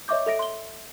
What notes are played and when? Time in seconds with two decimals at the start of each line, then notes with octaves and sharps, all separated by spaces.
0.08 C#5 D#5 E5 C#6 D6 G6
0.26 A4 E5 A#6 D7
0.39 C6 G7